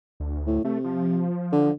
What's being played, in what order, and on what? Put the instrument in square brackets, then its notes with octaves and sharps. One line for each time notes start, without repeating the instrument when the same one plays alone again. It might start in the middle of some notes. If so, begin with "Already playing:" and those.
[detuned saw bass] D2
[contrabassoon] A2
[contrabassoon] C3 [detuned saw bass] A3
[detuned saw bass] F3
[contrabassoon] D3